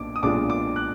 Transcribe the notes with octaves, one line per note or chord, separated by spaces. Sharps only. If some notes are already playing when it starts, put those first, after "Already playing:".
Already playing: B1 A#2 D4 D6
D#6
B1 A#2 G#3 D4 F4 D6
D6
F#6